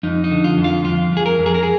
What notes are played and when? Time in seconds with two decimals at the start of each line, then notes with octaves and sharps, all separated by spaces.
0.03 F2 D#4
0.24 D#4
0.31 D3
0.44 F4
0.58 F2
0.64 F4
0.84 F2 F4
1.12 F2 G#4
1.26 A#4
1.39 F2
1.46 G#4
1.54 A#4
1.63 G#4